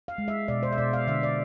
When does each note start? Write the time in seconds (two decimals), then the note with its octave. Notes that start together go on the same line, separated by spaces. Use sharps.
0.08 F5
0.18 G#3
0.28 E5
0.48 B2 D5
0.63 C5
0.72 E5
0.78 B2 D5
0.93 F5
1.07 D3 E5
1.23 D5